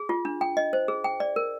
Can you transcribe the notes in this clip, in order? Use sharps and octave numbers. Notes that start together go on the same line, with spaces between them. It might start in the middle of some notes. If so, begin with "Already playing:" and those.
Already playing: G#4
F4
D4
G5
D#5
C5
G#4
G5
D5
A#4